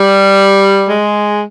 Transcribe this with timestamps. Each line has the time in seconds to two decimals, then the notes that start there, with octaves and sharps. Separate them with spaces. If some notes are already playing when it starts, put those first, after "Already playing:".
Already playing: G3
0.88 G#3